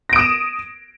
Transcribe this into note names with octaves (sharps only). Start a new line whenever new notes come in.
D#6 A#6 D7 E7